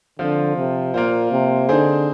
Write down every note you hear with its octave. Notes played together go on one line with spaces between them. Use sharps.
D3 F3 C4 F4
C3
A#2 A#3 F4 C5
C3
D3 C4 D#4 G#4 C5